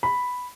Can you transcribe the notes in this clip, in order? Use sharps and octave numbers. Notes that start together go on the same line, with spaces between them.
B5